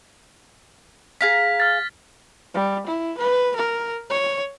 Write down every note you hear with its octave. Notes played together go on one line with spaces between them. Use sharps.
G#4 F5 A#5 B6
F6 A6
G3
E4
B4
A#4
C#5